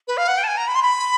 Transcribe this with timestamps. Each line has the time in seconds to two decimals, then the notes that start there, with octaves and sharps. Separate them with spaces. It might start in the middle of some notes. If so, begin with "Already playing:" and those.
0.08 B4
0.17 F5
0.28 F#5
0.38 G5
0.44 A5
0.47 G#5
0.57 A#5
0.68 B5
0.75 C6
0.82 B5